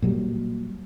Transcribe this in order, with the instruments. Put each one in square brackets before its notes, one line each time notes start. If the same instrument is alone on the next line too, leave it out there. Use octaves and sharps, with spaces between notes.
[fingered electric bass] A#2 F#3 G3